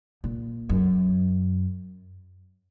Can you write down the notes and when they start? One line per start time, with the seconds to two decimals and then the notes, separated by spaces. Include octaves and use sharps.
0.24 A#2
0.69 F#2